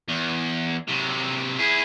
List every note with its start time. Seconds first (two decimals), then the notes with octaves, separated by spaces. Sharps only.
0.09 E2
0.88 C3 F#3
1.59 E4 G#4